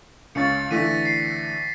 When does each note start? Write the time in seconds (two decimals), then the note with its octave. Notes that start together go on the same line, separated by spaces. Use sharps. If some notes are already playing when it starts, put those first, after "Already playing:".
0.35 C#2 C#4 A6 C#7
0.71 D3 E3 A3 A#6 B6 D#7
1.05 C7